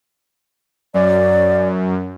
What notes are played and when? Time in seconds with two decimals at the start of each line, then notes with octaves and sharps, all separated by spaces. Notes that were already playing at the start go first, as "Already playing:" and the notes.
0.94 F#2 D5